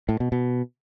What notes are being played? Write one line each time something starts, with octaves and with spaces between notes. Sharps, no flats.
A2
B2
B2